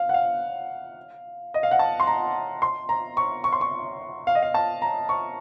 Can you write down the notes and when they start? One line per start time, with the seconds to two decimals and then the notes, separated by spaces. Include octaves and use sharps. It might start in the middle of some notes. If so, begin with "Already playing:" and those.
Already playing: F5
0.09 F#5
0.14 F5
1.54 D#5
1.63 F5
1.71 F#5
1.79 A5
2.00 C6
2.07 A#5
2.62 C6
2.89 A#5
3.17 C#6
3.44 C#6
3.52 C6
3.61 C#6
4.27 F5
4.35 D#5
4.42 F5
4.54 A5
4.82 A#5
5.09 C#6